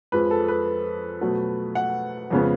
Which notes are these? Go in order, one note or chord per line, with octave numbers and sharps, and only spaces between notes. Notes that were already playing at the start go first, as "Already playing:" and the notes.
F2 F3 G#3 B4
A4
B4
B2 F#3 A3
F#5
F2 C#3 G#3 B3